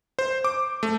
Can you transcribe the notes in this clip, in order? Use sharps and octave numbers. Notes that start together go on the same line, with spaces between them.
C5
D6
A3